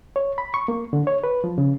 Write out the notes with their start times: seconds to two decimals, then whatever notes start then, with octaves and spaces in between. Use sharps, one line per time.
0.16 C#5
0.38 B5
0.54 C#6
0.68 A#3
0.93 D3
1.07 C#5
1.24 B4
1.44 F3
1.58 C#3